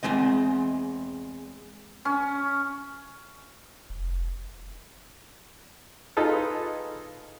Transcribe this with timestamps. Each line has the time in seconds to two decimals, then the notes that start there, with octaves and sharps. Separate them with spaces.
0.03 E2 G2 G#3 C4 D#5
2.05 C#4
3.90 F1
6.17 D#4 F4 G#4 A4 B4